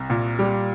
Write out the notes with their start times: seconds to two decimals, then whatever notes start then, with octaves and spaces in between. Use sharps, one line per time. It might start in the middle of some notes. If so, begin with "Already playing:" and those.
Already playing: C2
0.10 A#2
0.39 G3